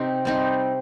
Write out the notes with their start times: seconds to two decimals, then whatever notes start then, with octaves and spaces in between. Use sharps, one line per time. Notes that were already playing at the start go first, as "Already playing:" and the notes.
Already playing: C3 C4 D#4
0.25 G3 C4 D#4